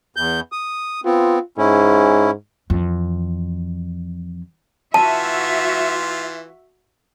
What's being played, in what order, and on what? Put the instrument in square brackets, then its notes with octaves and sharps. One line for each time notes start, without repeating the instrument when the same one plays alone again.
[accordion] E2 G6
D#6
[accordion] B3 C4 [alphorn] F4
[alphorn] G#2 [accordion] C#4 E4
[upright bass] F2 E3
[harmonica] E3 F4 [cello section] F#4 E5 [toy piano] A5